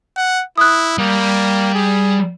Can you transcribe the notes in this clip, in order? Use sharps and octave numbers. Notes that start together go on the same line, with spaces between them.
F#5
E4 D#6 F#6
G3 A#3
G#4